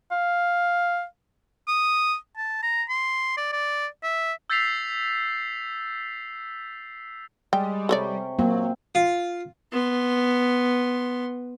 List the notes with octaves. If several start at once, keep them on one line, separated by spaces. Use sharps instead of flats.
F5
D#6
A5
A#5
C6
D5
D5
E5
E6 G6 A6 B6 C7 F7
G3 G#3 G5
C3 A4 C#5 D5 G5 C#6
F#3 A#3 C4
F4
B3 C6